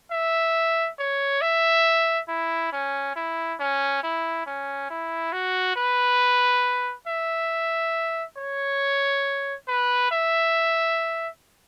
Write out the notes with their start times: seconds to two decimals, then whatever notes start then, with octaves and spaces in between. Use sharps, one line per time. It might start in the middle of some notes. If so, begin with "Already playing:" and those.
0.11 E5
0.99 C#5
1.41 E5
2.28 E4
2.73 C#4
3.16 E4
3.60 C#4
4.03 E4
4.46 C#4
4.90 E4
5.33 F#4
5.76 B4
7.08 E5
8.37 C#5
9.68 B4
10.11 E5